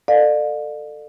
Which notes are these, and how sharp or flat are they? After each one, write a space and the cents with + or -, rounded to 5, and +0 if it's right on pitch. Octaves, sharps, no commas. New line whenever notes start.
A4 +20 D5 +35 F5 +35